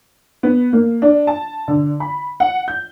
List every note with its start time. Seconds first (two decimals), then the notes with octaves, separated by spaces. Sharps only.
0.43 B3
0.73 A#3
1.02 D4
1.27 A5
1.68 D3
2.00 B5
2.40 F#5
2.68 G6